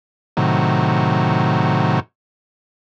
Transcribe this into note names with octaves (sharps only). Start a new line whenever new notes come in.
A2 C3 D#3 F#3